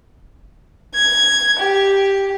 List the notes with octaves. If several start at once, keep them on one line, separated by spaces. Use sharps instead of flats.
G#6
G4